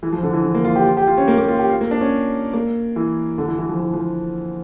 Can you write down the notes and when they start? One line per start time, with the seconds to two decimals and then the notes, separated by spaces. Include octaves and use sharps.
0.03 E3
0.12 F3
0.23 D3
0.33 E3
0.44 D3
0.54 A#3
0.65 F4
0.76 G4
0.87 F4
0.97 G4
1.07 F4
1.17 C#4
1.28 A#3
1.38 A#3
1.48 F4
1.59 G4
1.69 F4
1.81 A#3
1.91 D4
2.01 C#4
2.53 A#3
2.96 E3
3.38 D3
3.48 E3
3.58 E3
3.69 F3
3.79 E3
3.94 F3